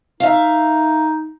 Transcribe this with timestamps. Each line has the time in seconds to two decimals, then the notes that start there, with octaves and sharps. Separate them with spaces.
0.20 D#4 E5 F5